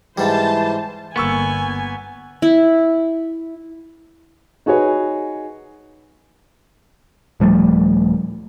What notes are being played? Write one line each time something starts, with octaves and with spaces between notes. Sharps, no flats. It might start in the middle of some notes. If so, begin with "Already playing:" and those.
G#2 E3 G3 C5 A5
G1 A#3 B3 G#5 C#6 E6
E4
D#4 F#4 G#4 B4 C#5
D#1 F3 G3 A3